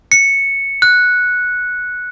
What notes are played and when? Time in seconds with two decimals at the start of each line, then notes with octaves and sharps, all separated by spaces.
0.12 C#7
0.82 F#6